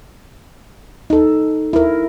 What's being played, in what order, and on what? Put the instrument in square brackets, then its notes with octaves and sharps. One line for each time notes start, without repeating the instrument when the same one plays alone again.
[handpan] D#4 A4
E4 A#4